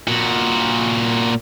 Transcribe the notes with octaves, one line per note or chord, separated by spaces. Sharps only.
A#2 F#4